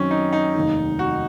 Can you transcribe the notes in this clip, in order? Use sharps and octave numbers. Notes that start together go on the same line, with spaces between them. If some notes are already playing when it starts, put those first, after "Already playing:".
Already playing: F#2 D#3 F#3 C4 C#4
D#4
D#4
F1 D#2 D#3
F#4